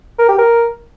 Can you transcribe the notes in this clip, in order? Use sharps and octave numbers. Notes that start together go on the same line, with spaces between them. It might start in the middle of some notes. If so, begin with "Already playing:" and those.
A#4
G4
A#4